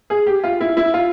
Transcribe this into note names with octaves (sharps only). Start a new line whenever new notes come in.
G#4
G4
F4
E4
E4
F4